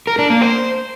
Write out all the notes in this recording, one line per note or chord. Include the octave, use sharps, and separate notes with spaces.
A#4
D4
A#3
C5